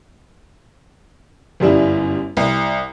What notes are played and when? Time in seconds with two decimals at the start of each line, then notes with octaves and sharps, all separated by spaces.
1.60 G1 F#2 G3 E4
2.37 C2